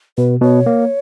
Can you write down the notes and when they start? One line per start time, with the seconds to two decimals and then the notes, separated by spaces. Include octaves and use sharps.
0.18 B2 B4
0.42 B2 C#5
0.66 A#3